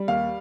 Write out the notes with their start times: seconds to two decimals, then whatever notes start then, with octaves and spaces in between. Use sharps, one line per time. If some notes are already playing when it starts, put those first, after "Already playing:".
Already playing: G3
0.08 D#2 F5